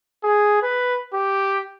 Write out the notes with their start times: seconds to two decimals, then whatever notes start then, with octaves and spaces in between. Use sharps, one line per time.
0.23 G#4
0.62 B4
1.14 G4